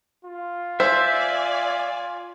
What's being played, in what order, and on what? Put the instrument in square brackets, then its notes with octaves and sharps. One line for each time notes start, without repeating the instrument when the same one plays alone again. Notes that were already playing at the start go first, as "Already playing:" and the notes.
[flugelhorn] F4
[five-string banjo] C5 [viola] D5 G#5 [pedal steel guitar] E5